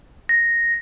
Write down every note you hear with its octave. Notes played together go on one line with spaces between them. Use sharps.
A#6